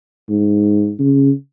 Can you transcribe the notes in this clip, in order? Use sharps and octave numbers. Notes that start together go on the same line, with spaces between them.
G#2
C#3